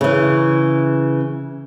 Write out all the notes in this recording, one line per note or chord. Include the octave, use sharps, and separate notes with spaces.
C#3 E3